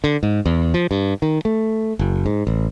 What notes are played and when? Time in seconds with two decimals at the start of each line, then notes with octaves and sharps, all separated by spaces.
0.04 D3
0.23 G#2
0.46 E2
0.74 F3
0.91 G2
1.22 D#3
1.45 A3
1.99 F#1
2.26 G#2
2.47 A1